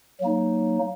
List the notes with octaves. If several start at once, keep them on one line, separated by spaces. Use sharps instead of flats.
F#3 A#3 D#4